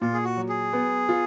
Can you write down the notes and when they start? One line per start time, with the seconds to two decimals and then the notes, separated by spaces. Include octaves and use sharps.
0.01 A#2 F4
0.14 G#4
0.25 F#4
0.37 F#3
0.49 G#4
0.73 B3
1.09 F4